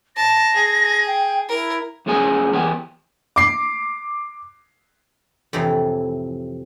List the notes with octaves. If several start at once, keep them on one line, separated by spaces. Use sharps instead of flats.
A5 A#6
G#4
G5
E4 A#4
F2 A2 G#3 C#4 G#5
E2 G4 G#5
D6 C7
F2 A2 C3 E3